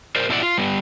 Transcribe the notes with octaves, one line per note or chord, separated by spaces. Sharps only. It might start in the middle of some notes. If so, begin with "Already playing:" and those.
A#4 C5 D5
B2 A3 E4 C5 D5 F#5
F4
G3 B3